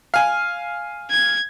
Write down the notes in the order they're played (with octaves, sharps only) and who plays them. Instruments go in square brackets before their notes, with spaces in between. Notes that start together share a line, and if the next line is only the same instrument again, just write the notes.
[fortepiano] F5 G#5
[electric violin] G#6